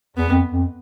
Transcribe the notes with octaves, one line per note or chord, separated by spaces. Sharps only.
E2 B3
F2
F2